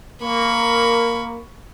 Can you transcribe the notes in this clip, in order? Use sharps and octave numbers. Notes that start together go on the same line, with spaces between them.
A#3 A#4 B5 C#6